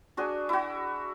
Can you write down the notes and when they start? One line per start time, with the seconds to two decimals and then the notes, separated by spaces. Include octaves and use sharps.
0.17 D4 F#4 G#4
0.49 E4 F#4